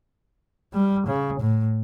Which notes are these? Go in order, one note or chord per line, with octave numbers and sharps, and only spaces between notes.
G3
C#3
A2